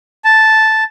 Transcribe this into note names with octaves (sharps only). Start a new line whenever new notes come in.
A5